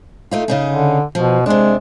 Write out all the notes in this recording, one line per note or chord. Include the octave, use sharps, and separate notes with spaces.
A3 D#4 F4
C#3 D#4 G#4
D3
B2 F3
C3 G#3 D4